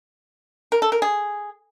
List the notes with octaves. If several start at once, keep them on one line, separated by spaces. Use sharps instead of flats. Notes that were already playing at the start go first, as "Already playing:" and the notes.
A#4
A4
A#4
G#4